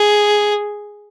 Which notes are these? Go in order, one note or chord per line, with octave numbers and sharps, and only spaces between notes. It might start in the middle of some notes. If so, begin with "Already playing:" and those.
Already playing: G#4